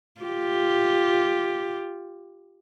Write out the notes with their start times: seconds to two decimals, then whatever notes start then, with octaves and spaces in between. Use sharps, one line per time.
0.21 F4 G4